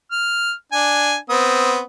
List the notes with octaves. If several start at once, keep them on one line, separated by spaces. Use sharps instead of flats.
F6
D4 G#5
B3 C4 D#6